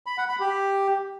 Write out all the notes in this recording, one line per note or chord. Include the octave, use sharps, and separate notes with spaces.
B5
F#5
B5
G4